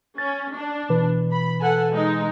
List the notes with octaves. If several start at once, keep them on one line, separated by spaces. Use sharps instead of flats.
C#4 A6
D4
B2 E3 B4
B5
A4 F#5 G#5
G#3 D#4